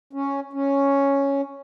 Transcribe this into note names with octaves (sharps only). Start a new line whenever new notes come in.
C#4
C#4